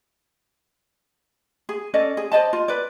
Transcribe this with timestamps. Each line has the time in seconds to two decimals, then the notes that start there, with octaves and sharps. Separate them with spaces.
1.69 G#4
1.94 C#4 A4 D5 D#5
2.17 G#4
2.32 C5 D5 D#5 A5
2.53 F4
2.68 B4 D5